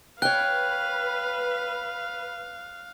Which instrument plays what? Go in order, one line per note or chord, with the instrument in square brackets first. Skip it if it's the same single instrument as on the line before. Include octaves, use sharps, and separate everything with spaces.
[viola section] B4 [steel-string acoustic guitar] C#5 G5 [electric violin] F5 [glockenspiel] F#6